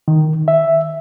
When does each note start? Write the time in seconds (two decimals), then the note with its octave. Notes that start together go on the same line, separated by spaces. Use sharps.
0.08 D#3
0.48 E5